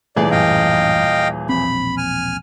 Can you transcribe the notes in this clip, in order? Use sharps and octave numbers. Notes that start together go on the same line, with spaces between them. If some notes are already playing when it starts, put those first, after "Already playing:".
D#1 E3 A3 G#4 D5
A1 F#2 D#5 F5 G5
E1 A#1 C4 B5
G#5 F6